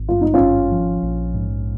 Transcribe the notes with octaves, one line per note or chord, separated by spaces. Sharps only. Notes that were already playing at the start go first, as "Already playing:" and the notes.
Already playing: G#1
G2 F4
D#4
C#4 F4
G#1
F3
A#1
G#2